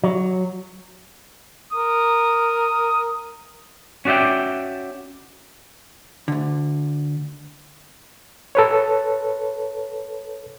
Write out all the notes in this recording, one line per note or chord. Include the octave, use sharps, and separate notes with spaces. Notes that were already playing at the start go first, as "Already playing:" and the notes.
F#3
A#4 D#6
C#4 F#4 D5 E5 G5
D2 D3
A4 B4 C#5